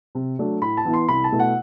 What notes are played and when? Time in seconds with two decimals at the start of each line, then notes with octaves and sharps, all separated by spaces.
0.15 C3
0.39 F#3 A3 D4
0.62 A2 B5
0.77 A5
0.85 E3 B3 E4
0.93 C6
1.08 C2 B5
1.24 A5
1.32 B2 A3 E4
1.39 F#5